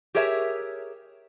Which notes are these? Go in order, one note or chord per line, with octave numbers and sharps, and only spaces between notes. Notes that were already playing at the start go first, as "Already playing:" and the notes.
G4 G#4 A#4 C#5 E5